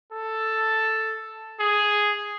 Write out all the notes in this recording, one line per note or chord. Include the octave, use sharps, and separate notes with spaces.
A4
G#4